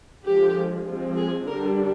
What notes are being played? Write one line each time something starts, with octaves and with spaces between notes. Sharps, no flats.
D3 F3 G#3 G4
F3 G#3 C4
G#4
D3 G3 D4 A#4